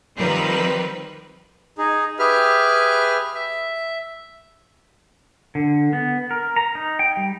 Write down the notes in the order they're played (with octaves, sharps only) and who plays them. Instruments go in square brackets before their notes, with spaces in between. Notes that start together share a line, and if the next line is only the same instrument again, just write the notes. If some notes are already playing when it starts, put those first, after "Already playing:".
[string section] D#3 F3 G3 C4 A#4 B4
[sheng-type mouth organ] D#4 G#4
G4 G#4 B4 E5 F6
E5
[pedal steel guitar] D3
B3
A#4
A#5
D#4
G5
G3